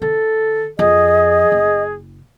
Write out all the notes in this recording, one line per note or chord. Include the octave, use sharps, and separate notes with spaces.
D3 A4
F2 G#4 D#5
F#1